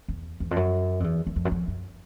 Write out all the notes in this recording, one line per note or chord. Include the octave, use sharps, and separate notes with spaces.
E2
E2
F2
F#2
F2
E2
E2
F2
F#2
F2
F#2